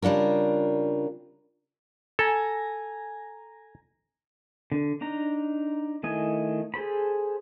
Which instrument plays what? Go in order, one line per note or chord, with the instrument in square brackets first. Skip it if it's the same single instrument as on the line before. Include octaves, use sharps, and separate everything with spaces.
[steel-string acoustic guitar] C#3 G3 D4 F4 A#4
[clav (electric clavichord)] A4 [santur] G#5 A#5
[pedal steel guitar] D3
D4 D#4 A#5
D#3 A3 E4 D#5 G#5
G#4 A4 C5 B5